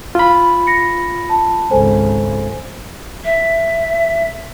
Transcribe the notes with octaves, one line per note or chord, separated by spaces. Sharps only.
F4 B5
A#6 C#7
A5
G#1 C#2 A4 C5 G#5
E5